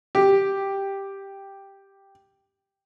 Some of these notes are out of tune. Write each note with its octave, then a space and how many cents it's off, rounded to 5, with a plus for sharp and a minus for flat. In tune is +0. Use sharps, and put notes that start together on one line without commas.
G4 +0